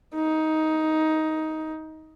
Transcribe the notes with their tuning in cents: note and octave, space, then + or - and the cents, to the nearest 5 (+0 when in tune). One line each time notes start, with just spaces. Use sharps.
D#4 +15